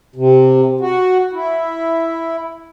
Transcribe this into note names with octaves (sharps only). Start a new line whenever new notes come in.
C3
F#4
E4